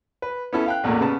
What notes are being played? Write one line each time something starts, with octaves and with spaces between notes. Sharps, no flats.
B4
B3 C#4 E4 A4
F5 G5 F#6
A1 E2 A#2 A3
C#3 B3 A5